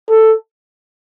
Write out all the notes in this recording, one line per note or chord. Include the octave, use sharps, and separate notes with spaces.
A4